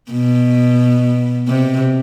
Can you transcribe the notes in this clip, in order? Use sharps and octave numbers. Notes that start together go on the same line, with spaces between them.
B2
C3